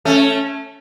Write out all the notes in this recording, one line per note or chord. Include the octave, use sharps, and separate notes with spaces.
A3 C#4